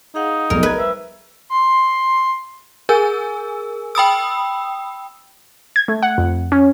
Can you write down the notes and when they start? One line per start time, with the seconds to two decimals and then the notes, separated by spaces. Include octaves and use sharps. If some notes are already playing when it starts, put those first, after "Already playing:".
0.15 D#4 G#4 F5 F#5
0.50 F1 B1 G#4 A#4 D5 D#5
0.63 A#4 B4 G#6
0.78 G3 C5 E5
1.50 C6
2.89 G#4 A#4 G#5 E6
3.95 G5 B5 D#6 E6
5.76 G#6
5.88 A3
6.03 F#5
6.18 F2
6.52 C#4